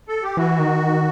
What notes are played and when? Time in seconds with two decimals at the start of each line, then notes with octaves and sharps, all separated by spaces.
0.08 A4
0.23 G4
0.37 E3 F#4
0.59 D#3